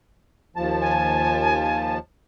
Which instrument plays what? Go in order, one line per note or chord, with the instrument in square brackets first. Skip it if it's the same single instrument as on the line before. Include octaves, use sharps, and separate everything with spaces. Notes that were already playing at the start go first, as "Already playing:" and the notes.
[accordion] D#2 F3 A5
[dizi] G#5